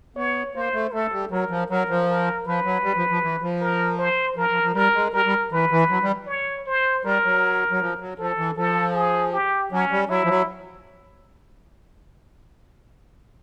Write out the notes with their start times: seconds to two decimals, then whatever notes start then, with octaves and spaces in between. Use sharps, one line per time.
0.16 B3 C#5
0.55 A#3 C5
0.74 A3
0.93 A3 A4
1.12 G3
1.31 F#3 A#4
1.50 F3
1.70 F#3 A#4
1.89 F3
2.08 A#4
2.46 F3 B4
2.65 F#3
2.84 G3
2.96 F3
3.10 F3
3.23 E3
3.42 F3
3.61 A#4
3.98 C5
4.36 F3 A#4
4.50 F3
4.63 F3
4.75 G3 A#4
4.95 G#3
5.14 G3 A#4
5.25 G3
5.52 E3 B4
5.71 E3
5.90 F#3
6.03 G3
6.27 C#5
6.67 C5
7.05 G3 A#4
7.24 F#3
7.71 F#3
7.80 F3
8.00 F#3
8.18 F3 A4
8.38 E3
8.57 F3 A4
8.95 G#4
9.33 G4
9.72 F#3 C#4
9.91 G3
10.09 F#3 E4
10.24 F3
10.29 F#3